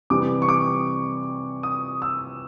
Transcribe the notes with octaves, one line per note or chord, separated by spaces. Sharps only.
C3 E3 G3 D6
C#6
D6
D#6
E6